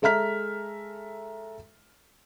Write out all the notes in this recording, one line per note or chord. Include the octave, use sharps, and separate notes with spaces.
G#3 A4 E5 A#5 F6 B6